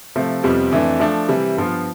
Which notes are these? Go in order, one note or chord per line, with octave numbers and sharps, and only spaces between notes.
C3 F3 A3
F2 C3 G3 B3 F4
F2 E3 A3 D4
F3 A3 D4 A4
C3 E3 G3
G2 F3 B3 F4